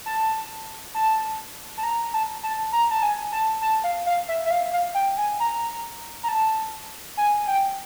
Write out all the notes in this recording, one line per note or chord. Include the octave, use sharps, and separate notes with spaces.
A5
A5
A5
A#5
A5
A5
A#5
A5
G#5
A5
A5
F5
F5
E5
E5
F5
F5
G5
G#5
A#5
A#5
A5
G#5
G5